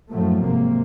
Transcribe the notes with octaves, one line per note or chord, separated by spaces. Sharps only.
F#2 A2 F3 F#3 A3
G#1 C3 A#3